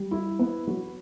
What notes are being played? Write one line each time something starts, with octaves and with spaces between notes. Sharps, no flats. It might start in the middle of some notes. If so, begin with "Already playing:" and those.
Already playing: G3
E4
B3
F#3